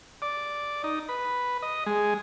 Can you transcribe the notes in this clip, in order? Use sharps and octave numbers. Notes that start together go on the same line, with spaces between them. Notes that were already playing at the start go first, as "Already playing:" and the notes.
D5
D#4
B4
D#5
G#3